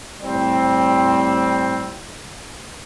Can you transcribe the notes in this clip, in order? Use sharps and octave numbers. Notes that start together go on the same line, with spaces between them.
A2 G3 C4